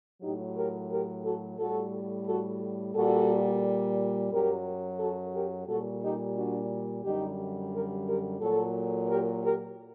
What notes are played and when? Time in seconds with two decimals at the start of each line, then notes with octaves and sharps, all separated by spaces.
0.22 A2 F#3 D#4 G4
0.56 G4 A#4
0.90 G4 A#4
1.24 F#4 A4
1.58 A2 G3 F#4 A4
2.27 F#4 A4
2.95 A#2 G3 F#4 A4
4.31 F#2 F#3 G4 A#4
4.99 F#4 A4
5.34 G4 A#4
5.68 A#2 G3 F#4 A4
6.02 D#4 G4
6.36 D4 F#4
7.04 F#2 D3 G3 D#4 G4
7.72 G4 A#4
8.06 G4 A#4
8.40 A#2 F#3 F#4 A4
9.08 G4 A#4
9.43 G4 A#4